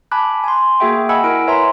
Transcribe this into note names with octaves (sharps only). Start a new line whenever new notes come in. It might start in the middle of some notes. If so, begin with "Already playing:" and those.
G#5 A5 B5 D6 F#6
G#5 C6
A#3 F#4 G#4 E5 G5
D#5 F#5 G#5 B5 E6
E4 A#4 B5 D7
B4 C#5 E5 G#5 A#5 C6